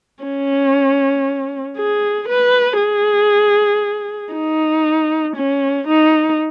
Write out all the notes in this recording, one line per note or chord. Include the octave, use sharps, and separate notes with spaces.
C#4
G#4
B4
G#4
D#4
C#4
D#4